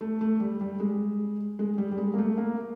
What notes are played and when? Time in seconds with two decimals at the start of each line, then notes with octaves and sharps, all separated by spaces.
0.01 A3
0.21 A3
0.40 G3
0.61 G3
0.80 G#3
1.59 G#3
1.78 G3
1.92 G3
1.98 G#3
2.14 A#3
2.18 A3
2.38 A#3